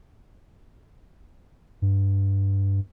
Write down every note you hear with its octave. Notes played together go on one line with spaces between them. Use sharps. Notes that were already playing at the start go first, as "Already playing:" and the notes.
G2